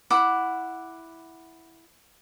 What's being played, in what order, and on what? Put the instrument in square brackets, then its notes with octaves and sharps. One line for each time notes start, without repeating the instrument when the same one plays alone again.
[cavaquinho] E4 F#5 D6